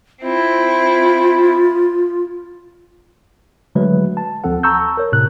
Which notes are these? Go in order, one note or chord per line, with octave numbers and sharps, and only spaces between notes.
C4 E4 F4
D3 F#3 G#3 A3 B4
A5
D2 F3 C4 A4 F#5
A5 A#5 C#6 E6 G6
A#4 C#5
A2 C3 F#6